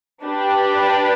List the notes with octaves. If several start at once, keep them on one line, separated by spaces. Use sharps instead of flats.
D4 G4 B4